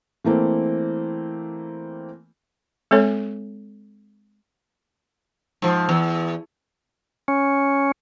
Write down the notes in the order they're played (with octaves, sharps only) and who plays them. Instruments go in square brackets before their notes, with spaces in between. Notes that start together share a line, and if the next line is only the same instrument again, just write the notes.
[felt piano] E3 A3 A#3 C4
[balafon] G#3 C4 A4 C#5
[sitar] G#2 F3
E2
[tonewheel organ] C#4